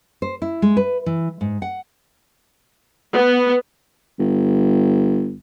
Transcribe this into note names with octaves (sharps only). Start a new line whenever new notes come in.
C5
E4
G#3
B4
E3
G#2
F#5
B3
G1